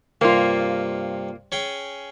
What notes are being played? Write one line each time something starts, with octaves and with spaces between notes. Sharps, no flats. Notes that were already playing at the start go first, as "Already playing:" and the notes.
G2 C3 A#3 F4
C#4 G#4 G5